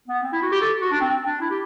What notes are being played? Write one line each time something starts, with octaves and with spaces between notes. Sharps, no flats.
B3
C4
E4
F#4
G4
A4
F#4
D4
C4
C4
D4
E4
G4